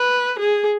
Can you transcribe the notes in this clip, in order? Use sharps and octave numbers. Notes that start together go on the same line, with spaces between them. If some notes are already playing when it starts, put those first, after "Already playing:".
Already playing: B4
G#4